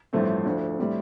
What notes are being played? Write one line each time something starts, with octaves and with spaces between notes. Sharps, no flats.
A1 G2 F3 A3 C4
D2 D3 F3
A2 G3 C4